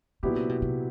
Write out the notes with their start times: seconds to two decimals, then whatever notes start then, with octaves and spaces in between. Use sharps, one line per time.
0.23 A#2 C#3 F#3 B3 E4 G4
0.36 C3
0.49 B2
0.62 C3